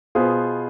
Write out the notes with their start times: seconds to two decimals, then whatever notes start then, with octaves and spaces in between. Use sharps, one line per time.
0.15 B2 B3 F4 G#4 C5